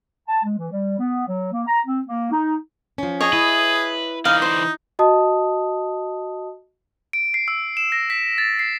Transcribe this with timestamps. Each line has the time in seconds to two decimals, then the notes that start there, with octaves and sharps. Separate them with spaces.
0.28 A5
0.43 G#3
0.58 E3
0.71 G3
0.99 B3
1.27 F#3
1.52 A#3
1.67 A#5
1.86 C4
2.07 A#3
2.31 D#4
2.98 F3 C#4
3.21 G#4 C#5 D#5 G#5
3.33 E4 B4
4.25 D3 E3 D#4 F5
4.42 C5
4.99 F#4 D#5 A5 D#6
7.13 D7
7.34 C7
7.48 E6
7.77 E7
7.92 A#6
8.10 B6
8.38 A6
8.59 C7